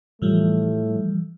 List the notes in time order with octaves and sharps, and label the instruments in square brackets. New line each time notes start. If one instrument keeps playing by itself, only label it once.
[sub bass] A2 [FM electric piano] E3 F3 G3 [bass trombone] A3